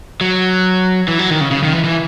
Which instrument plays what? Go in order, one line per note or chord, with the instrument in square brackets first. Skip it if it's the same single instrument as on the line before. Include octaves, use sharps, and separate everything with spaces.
[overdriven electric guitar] F#3
E3
F#3
D#3
C#3
C#3
D#3
E3
E3